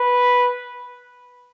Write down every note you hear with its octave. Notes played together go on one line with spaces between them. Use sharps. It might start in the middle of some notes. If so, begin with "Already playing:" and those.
Already playing: B4